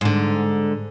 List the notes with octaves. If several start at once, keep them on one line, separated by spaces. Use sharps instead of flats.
G#2 D3